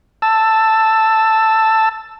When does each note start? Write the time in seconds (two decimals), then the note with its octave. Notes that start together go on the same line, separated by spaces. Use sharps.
0.22 A5 E6